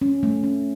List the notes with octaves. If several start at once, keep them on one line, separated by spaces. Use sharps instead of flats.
C#4
A3
C#4